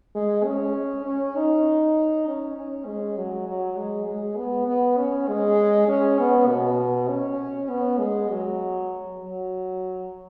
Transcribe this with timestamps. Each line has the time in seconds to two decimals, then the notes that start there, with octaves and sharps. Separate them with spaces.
0.15 G#3
0.45 C#4
1.06 C#4
1.36 D#4
2.27 C#4
2.57 C#4
2.86 G#3
3.17 F#3
3.47 F#3
3.77 G#3
4.08 G#3
4.37 B3
4.68 B3
4.97 C#4
5.29 G#3
5.88 C#4
6.19 B3
6.49 B2
7.09 C#4
7.70 B3
7.99 G#3
8.30 F#3
9.21 F#3